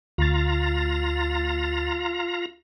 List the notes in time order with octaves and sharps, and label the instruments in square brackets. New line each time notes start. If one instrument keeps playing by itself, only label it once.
[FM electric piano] D2 A6 [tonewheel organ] F4 A#5